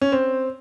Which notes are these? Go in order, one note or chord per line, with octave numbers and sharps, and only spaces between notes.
C#4
C4